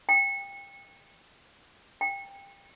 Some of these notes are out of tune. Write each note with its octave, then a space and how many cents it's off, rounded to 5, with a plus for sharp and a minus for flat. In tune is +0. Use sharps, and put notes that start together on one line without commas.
G5 +25
G5 +20